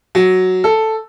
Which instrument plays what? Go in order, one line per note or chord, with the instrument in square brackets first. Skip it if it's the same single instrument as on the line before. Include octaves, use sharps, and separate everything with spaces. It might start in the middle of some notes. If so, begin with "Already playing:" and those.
[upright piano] F#3
A4